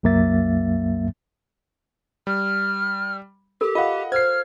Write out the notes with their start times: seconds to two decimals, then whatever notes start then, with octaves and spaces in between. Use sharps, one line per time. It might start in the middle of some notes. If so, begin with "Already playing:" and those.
0.03 C2 F#2 F#3 A#3 E5 A6
2.27 G3 F6
3.61 G4 A4 A#4
3.75 F4 D#5 F5 F#5
4.12 C5 F6 G#6 C7